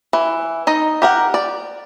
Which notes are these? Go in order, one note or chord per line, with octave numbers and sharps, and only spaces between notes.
E3
D#4 D#5
G4 A#4 F#5
D5